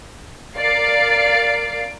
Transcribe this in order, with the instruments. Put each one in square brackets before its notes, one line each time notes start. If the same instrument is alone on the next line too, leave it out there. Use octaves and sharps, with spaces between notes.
[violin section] A#4 D5 F5 A6 C7 D7